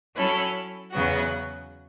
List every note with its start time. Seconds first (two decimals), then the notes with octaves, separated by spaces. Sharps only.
0.15 F#3 C#4 E4 A4 C#5
0.92 E2 C#3 F#3 B3 F#4